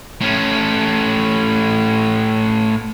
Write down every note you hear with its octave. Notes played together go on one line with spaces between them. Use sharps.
A2 C#4